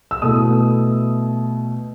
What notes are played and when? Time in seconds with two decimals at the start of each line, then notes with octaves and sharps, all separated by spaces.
0.11 E6
0.22 B2 A3 E4 D#6